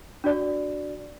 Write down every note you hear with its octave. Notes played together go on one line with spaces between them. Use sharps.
D4 F#4 D5